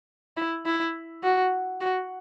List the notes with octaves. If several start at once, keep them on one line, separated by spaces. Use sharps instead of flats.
E4
E4
F#4
F#4